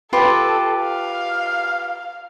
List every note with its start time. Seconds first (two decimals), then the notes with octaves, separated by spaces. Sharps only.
0.13 F4 G4 A4 B4
0.84 F5